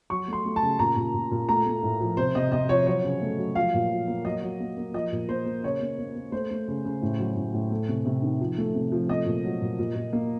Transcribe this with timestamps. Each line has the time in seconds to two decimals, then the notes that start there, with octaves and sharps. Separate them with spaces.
0.10 F#3 C#6
0.28 A3 C6
0.45 A3
0.56 A5
0.63 C#3
0.79 A#2 A#5
0.96 A#2
1.14 A#2
1.31 A#2
1.49 A3 A#5
1.66 A3
1.83 A2
2.00 F3
2.17 C3 C5
2.35 C3 D#5
2.52 C3 D#5
2.69 F3 C#5
2.87 F#3 C#5
3.04 C#3
3.22 A3
3.38 F#3
3.55 F3 F5
3.74 A#2
3.90 F3
4.08 A#3
4.25 F#3 D#5
4.43 F#3
4.60 A#3
4.77 A#3
4.94 F3 D#5
5.12 A#2
5.28 A#3 C5
5.46 A#3
5.63 C#3 C#5
5.81 A#3
5.98 A#3
6.15 A#3
6.32 A3 C5
6.51 A3
6.68 C#3
6.85 C#3
7.02 A2
7.19 F#3
7.36 A2
7.54 A2
7.70 A3
7.89 C3
8.06 C3
8.22 D#3
8.41 F3
8.58 A3
8.75 C3
8.92 F3
9.09 A3 D#5
9.26 A#2
9.45 F#3
9.62 A#2
9.79 A#2
9.95 A#2
10.13 A#3